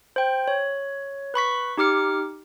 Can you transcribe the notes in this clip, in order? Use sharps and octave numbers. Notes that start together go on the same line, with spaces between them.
C5 G5
C#5
B4 B5 C#6 B6
D#4 G4 D6 F6 C#7